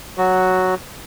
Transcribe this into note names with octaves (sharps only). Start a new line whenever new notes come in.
F#3 F#4